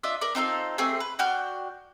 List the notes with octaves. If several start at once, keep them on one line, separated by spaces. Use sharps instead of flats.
D4 F4 D#5 E5
A#4 D5
C4 D#4 F4 A4
A3 C4 G4 G#4
B4
D4 F#4 G5 F6